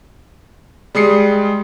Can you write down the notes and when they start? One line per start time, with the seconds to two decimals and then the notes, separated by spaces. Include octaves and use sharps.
0.95 G3 G#3 D#6 C7 C#7